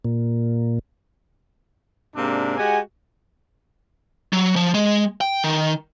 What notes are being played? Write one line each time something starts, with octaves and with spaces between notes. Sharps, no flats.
A#2
G#2 C3 A#3 D4
G#3 F#4 G4 F#5 G#5
F#3
F3
G#3
G5
D#3